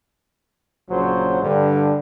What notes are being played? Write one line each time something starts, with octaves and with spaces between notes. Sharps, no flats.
A#1 C#3 F#3 C5
G2 D3